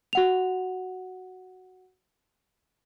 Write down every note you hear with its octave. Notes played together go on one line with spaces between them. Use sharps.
F#4 F#5 F7